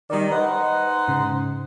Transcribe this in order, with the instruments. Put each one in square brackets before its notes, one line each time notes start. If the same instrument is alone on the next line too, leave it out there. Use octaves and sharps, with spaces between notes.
[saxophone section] D#3 [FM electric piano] G3 D5
[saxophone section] D#4 C5 F#5 [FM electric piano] B4 D#5
[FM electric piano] G#2 C#3